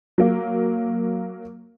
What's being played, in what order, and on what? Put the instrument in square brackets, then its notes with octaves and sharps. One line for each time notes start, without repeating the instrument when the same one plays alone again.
[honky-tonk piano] F#3 A#3